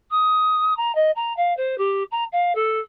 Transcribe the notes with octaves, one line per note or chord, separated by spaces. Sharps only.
D#6
A#5
D#5
A#5
F5
C5
G4
A#5
F5
A4